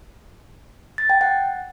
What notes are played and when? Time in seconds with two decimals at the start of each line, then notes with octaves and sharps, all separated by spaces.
0.98 A6
1.10 G5
1.21 F#5